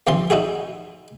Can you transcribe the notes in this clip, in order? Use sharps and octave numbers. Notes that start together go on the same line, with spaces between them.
D#2 C3 E3 F3 C6
D#4 E4 F#4 G#4